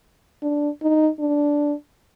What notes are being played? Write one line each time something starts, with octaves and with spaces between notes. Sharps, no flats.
D4
D#4
D4